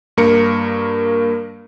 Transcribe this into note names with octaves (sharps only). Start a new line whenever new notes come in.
G2 A#3 A#4 C#7